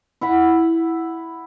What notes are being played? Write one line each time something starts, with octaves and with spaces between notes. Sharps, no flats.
E4 F#5 B5